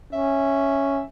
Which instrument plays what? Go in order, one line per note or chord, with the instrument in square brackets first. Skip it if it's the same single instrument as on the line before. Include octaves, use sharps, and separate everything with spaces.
[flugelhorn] C#4 [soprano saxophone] E5